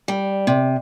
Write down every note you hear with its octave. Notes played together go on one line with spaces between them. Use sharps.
G3
C3